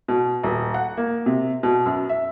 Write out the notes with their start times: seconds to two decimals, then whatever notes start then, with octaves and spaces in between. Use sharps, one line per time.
0.08 B2
0.43 D#1
0.74 F#5
0.97 A#3
1.26 C3
1.63 B2
1.86 F#2
2.09 E5